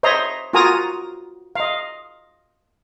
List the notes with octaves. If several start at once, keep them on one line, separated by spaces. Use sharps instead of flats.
C5 C#5 D#5 E5 A#5 C6
F4 F#4 A#4 G#5 A#5 D#6
D#5 F5